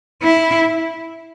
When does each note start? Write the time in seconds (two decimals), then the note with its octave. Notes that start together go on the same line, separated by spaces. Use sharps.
0.23 E4